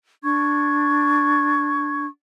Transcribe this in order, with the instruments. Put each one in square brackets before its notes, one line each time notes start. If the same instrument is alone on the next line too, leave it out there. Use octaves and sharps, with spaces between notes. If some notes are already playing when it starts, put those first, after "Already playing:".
[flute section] D4 C#6 G#6